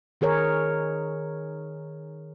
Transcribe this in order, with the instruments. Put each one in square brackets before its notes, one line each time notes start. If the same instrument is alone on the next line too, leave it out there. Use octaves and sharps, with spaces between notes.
[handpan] D#3 G#4 A#4 C#5